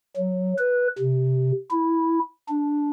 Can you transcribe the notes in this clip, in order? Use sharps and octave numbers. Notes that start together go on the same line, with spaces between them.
F#3
B4
C3
E4
D4